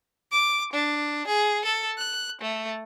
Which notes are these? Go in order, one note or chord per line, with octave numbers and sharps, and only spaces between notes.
D6
D4
G#4
A4
F#6
A3